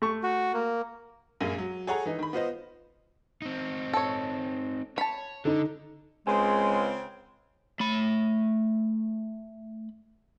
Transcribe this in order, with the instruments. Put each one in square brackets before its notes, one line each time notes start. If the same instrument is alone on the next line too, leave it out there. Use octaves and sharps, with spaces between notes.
[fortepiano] A3 C#6
[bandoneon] F#4
A#3
[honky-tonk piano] A#1 F#2 A#3 G#4 F5 D#7
F#3
G#4 A4 C#5 F#5 G#5 A#5
E3 D#4
D#3 B5
B3 F4 C5 D#5
[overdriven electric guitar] C4 D#4
[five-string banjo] A4 C#5
[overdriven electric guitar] C#5 [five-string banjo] A5 B5
[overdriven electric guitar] D3 [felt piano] D#4 A4
[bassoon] C#2 [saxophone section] C#3 C4 [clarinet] G#3 [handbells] G#5 C6
[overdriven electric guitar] A3 B5